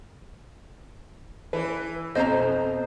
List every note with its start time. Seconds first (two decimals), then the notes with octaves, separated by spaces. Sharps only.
1.53 E3 B4
2.15 B1 F2 B2 C5 D#5 A#5